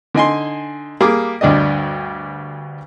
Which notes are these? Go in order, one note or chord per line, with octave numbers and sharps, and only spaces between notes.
D3 D#4 G#5 C6
G3 A#3 G#4 D6
D2 G2 D4 G4 D#5